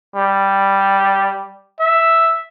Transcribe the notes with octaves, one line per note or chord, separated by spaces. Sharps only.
G3
E5